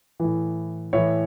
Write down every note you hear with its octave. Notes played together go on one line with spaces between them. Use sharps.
A2 E3
A2 E3 C#5 E5